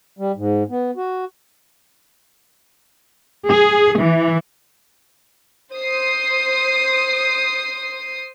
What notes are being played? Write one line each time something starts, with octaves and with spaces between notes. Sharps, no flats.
G3
G#2
B3
F#4
G#4
E3
C5 D#6 C7